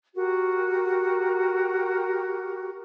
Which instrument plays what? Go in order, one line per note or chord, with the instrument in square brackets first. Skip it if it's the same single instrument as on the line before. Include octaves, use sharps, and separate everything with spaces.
[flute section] F#4 G4 A#4